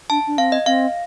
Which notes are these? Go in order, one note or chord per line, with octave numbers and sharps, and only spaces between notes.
D4 A5
D4
C4 F5
D#5
C4 F5